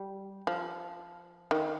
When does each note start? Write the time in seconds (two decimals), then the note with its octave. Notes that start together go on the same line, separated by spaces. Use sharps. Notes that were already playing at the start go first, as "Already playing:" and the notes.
Already playing: G3
0.47 F3
1.51 D#3